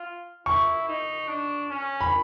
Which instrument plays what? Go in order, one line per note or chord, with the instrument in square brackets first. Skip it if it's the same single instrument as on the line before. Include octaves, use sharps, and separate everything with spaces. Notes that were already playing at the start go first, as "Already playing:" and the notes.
Already playing: [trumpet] F4
[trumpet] E4 [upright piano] C#6
[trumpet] D#4
D4
C#4
[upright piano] B5